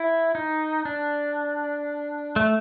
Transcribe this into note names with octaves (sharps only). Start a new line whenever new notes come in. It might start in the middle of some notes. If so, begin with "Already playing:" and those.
Already playing: E4
D#4
D4
A3